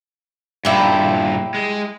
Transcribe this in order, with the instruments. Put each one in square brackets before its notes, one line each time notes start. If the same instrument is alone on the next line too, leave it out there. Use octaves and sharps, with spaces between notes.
[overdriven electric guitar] G2 A#2 [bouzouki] E4 G4
[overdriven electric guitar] G#3